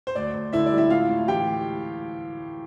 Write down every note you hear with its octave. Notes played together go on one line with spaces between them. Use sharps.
C5
D2 D5
D2
D3 E4 E5
D5
G3
E4 E5
A2 F4 F5
A2
E3 G4 G5